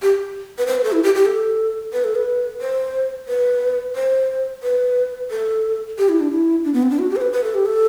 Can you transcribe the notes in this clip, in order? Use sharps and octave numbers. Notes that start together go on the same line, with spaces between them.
G4
B4
C5
B4
A4
E4
G4
G4
A4
B4
A4
B4
C5
B4
C5
B4
A4
G4
E4
D4
E4
D4
B3
C4
D4
F#4
G4
C5
B4
B4
A4
G4
A4